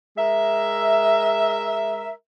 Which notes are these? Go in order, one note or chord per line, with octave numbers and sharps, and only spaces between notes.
G#3 A#4 E5